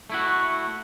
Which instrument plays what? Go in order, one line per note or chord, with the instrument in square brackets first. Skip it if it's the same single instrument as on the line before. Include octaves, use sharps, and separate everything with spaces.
[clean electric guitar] A3 E4 F#4